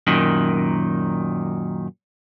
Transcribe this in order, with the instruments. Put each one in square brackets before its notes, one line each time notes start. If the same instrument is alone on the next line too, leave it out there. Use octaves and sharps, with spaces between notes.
[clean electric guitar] F#2 A#2 D#3